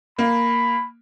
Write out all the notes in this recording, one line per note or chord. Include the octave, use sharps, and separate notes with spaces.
A#3 B5